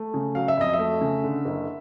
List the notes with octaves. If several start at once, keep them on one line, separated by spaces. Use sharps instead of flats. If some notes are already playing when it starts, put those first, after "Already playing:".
Already playing: A3
C#3
F#3 F5
E5
F2 D#5
E5
A3
C#3
D3
F#1